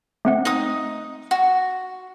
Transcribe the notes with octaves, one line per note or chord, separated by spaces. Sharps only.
A3 C4 F#5
D#4 D#6
F#4